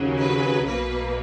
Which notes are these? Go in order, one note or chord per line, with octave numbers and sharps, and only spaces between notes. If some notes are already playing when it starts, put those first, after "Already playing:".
Already playing: D#2 C#3 F#3
B4
B1 B2 A#3 B4